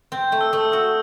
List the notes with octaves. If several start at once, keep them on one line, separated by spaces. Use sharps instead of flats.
C4 G6
A3
E6
A3 D#6
F#4 E6